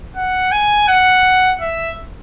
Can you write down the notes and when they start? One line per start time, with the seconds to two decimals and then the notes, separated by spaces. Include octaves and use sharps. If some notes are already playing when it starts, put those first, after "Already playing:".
0.16 F#5
0.52 G#5
0.88 F#5
1.61 E5